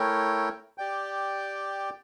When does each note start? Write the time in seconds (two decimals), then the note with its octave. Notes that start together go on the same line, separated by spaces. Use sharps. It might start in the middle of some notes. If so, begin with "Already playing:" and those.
Already playing: A3 E4 A#4 C#5 G5
0.78 G4 D5 G5